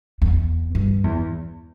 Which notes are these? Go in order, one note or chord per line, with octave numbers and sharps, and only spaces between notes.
E2
G2
E2